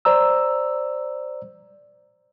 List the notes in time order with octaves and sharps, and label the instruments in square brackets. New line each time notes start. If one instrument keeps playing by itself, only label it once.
[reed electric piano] C5 D5 A#5 E6